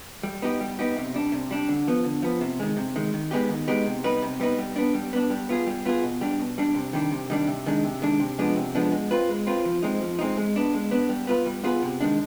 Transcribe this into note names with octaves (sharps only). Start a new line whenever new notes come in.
G3
B3 D#4 G4
G3
B3 D#4 G4
C3
G3 D4
C3
G3 D4
D3
F3 B3
D3
F3 B3
C3
D#3 G#3
C3
D#3 G#3
D#3
G#3 B3 D#4 G4
D#3
G#3 B3 D#4 G4
C3
G3 B3 D#4 B4
C3
G3 B3 D#4 B4
G3
B3 D4
G3
B3 D4
G3
B3 F4 G#4
G3
B3 F4 G#4
B2
G3 D4
B2
G3 D4
C3
D#3 G3 D4
C3
D#3 G3 D4
C3
D#3 G#3 D4
C3
D#3 G#3 D4
C3
F3 G#3 B3 D4
C3
F3 G#3 B3 D4
G#3
C4 F4 B4
G#3
C4 F4 B4
F3
G#3 C4 D#4
F3
G#3 C4 D#4
G#3
B3 D4
G#3
B3 D4
G3
B3 F4 G#4 B4
G3
B3 F4 G#4 B4
C3
D#3 G#3 D4